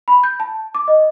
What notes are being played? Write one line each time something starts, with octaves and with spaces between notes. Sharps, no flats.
B5
G6
A5
D6
D#5